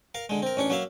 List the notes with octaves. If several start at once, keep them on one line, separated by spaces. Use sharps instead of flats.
A#4 F5
D3 G#3
C4 A#4
A1 C#4 D4 C#6
F#3 A#3 E5 F5